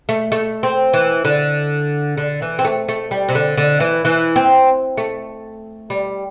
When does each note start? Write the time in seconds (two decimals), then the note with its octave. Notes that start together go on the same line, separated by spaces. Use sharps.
0.09 A3
0.32 A3
0.63 C4
0.93 E3
1.25 D3
2.17 D3
2.42 E3
2.59 C4
2.65 A3
2.88 A3
3.11 G3
3.29 C3
3.35 D3
3.58 D3
3.80 E3
4.05 E3
4.36 C4
4.98 A3
5.90 G3